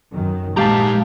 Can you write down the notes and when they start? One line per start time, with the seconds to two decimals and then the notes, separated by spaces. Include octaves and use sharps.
0.13 F#2 D#3
0.57 A#1 D#3 G#3 G4 F5 A5 A#5